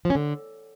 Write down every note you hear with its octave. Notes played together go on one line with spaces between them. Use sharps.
F3
C#4
D3